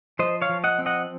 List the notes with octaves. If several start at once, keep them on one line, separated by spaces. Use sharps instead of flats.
F3 C5 D#5
C#5 F5
F3
D#5 F#5
C4
D#5 F#5